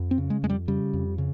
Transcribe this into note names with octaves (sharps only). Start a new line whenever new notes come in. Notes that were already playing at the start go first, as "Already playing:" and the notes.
Already playing: F2
C4
C#3
G#3
F2 G#3
G3
C#3 G3
F2
C#3